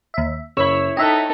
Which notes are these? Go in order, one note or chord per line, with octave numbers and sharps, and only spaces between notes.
D#2 E5
F#1 E4 C#5 E6
D#4 A4 D#5 E5 G5 E6 F#6